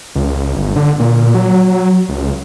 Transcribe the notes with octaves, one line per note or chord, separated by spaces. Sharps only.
C#2
G1
D3
A#2
F#3
C#2